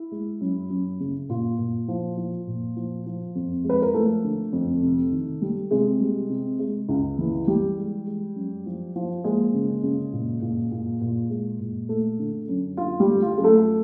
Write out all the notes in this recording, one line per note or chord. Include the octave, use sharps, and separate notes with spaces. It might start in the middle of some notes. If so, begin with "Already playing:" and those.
Already playing: E4
G#3
F#2
F#2
C#3
A#2 F4
A#2
F3
F3
A#2
F3
F3
F2
G#3
B4
A#4
F3 A3 A4
D3
F2
C3
D#3
G3
C3 G#3 G#4
G3
C3
G#3
C#2
E3
E3 G3 G4
G#3
G#3
F#2
F3
F3
G#3 A#3 G#4
C#3
C#3
A#2
A#2
A#2
A#2
G#3
A#2
A3
D3
F#2
D3 F4
G3 G4
A3
F4
F#2 G#4
A3 A4